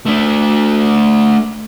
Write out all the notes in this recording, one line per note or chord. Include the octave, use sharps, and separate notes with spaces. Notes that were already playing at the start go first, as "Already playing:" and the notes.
A3 D4